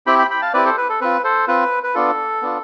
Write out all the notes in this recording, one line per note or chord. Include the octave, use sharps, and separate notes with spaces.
C4 E4 G4 G5 B5
G5 B5
G5 B5
F5 A5
C4 E4 G4 B4 D5
A4 C5
B4
A4
C4 F4 B4
A4 C5
C4 F4 B4
B4
B3 D4 F4 A4
B3 D4 F4